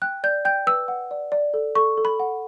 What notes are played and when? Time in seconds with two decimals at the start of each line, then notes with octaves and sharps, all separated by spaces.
0.02 G5 F#6
0.24 D5 G6
0.45 G5 G6
0.67 B4 E6
0.88 F#5
1.11 D5
1.32 D5
1.54 A4
1.75 A4 C#6
1.98 A4
2.05 B5
2.20 F#5